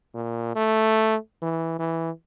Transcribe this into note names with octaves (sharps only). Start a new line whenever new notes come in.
A#2
A3
E3
E3